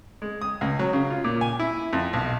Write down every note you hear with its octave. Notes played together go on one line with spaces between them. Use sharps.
G#3
D#6
C#2
F#3
C#3
F4
A#2
G#5
E4
F2
B1